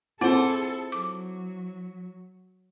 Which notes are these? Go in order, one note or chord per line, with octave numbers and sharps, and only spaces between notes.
C4 E4 F4 G#4 A4 C5 F#5
F#3 D6